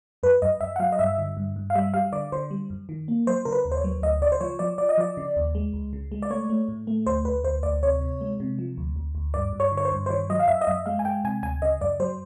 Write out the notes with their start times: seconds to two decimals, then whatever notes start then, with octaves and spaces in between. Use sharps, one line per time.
0.23 F#2 B4
0.42 F#2 D#5
0.61 F#2 E5
0.76 F#5
0.80 F#3 F5
0.92 D#5
0.99 G2 E5
1.18 D3
1.37 G2
1.56 G2
1.70 F5
1.75 G3 E5
1.94 G3 F5
2.13 D3 D5
2.32 D3 C5
2.51 G3
2.70 F#2
2.89 D#3
3.08 A#3
3.27 F#3 C5
3.45 C#3 A#4
3.52 B4
3.65 D#2
3.72 C5
3.77 C#5
3.84 F#3
4.02 D2 D#5
4.21 C#3 D5
4.32 C5
4.41 F3 C#5
4.59 F3 D5
4.78 F3 D5
4.89 D#5
4.98 F3 D5
5.17 C#3
5.36 D#2
5.55 G#3
5.73 C#2
5.93 C#3
6.12 G#3
6.22 D5
6.30 A3 C#5
6.50 A3
6.68 A2
6.87 A3
7.06 D2 C5
7.25 D2 B4
7.44 D2 C5
7.63 D2 D5
7.83 C3 C#5
8.01 C3
8.21 G#3
8.40 C3
8.59 F3
8.77 D2
8.96 D2
9.15 D2
9.34 G2 D5
9.53 G2
9.60 C#5
9.72 D3
9.77 C#5
9.85 C5
9.92 G2
10.06 C5
10.10 D#3 C#5
10.30 F#3 D#5
10.39 F5
10.48 F#2 E5
10.61 D#5
10.67 F#2 E5
10.86 G#3 F5
10.99 G#5
11.05 G#3 G5
11.24 C3 G#5
11.43 D2 G#5
11.62 C#3 D#5
11.81 F#2 D5
12.00 F#3 C5